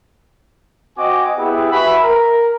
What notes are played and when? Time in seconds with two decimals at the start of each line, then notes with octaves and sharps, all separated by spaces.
0.97 C4 F#4 D#5 G#5 D6
1.37 B3 E4 G4 G#4
1.72 F#4 B4 E5 G#5 B5
2.02 A#4